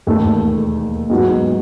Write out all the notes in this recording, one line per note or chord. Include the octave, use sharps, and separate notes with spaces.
E1 D#2 D#3 A3
G#2 F#3 B3 D#4 F#4